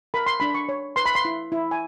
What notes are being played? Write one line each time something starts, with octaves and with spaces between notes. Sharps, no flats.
A#4 B5
C6
D4 B5
C#6
C#5
B4 C6
B5
C6
E4
E4
G#5